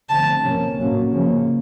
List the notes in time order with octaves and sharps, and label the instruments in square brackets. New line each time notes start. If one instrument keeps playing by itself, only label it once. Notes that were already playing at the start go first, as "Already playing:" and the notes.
[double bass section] D3 F3 A3 C4 [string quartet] A5
[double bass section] C3 F3 A#3 C#4
A2 F#3 A#3 C#4
C#3 F3 A#3 C#4